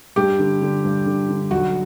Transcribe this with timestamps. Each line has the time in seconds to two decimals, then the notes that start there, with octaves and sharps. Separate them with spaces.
0.16 G2 G4
0.39 D3
0.62 D3
0.84 G2
1.06 D3
1.29 D3
1.51 B1 F#4